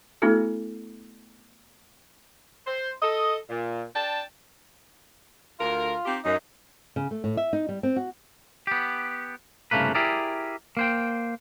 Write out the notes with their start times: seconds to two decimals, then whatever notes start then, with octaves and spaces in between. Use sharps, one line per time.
0.22 A3 B3 D4 E4 F#4 A4
2.66 C5
3.02 A4 D#5
3.50 A#2
3.95 D4 G5 A5
5.60 D2 F4 A#4
6.06 C4 D#4 G4
6.25 F#2 D#4
6.96 C#3
7.11 A3
7.24 A2
7.37 E5
7.53 D#4
7.69 G3
7.83 C4
7.96 F#4
8.67 B3 G4
9.71 C2 G2 C#3 A3 A#3 B4
9.95 E4 G4 G#4 A#4 D5
10.77 A#3 C5 G5